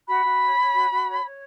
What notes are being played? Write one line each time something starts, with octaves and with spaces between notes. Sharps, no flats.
F#4 B5
F#4
C#5
C#5
F#4
F#4
C#5
C#5